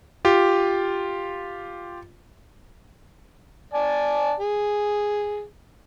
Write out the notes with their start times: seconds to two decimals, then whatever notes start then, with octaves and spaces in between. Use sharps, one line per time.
0.25 F4 G4
3.74 D5 G#5 A5
4.40 G#4